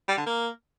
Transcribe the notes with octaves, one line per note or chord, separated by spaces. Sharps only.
G3
D3
A#3